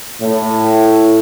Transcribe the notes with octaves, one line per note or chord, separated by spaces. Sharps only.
A2